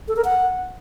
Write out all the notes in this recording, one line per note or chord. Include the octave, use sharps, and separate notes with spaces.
A4
A#4
F#5